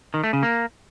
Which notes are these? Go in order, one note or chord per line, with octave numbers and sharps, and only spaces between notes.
D#3
A3
C#3
A#3